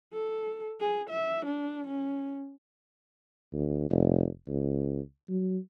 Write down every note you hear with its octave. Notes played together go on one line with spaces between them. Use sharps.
A4
G#4
E5
D4
C#4
D2
F1
C#2
F#3